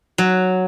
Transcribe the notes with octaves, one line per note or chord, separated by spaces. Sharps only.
F#3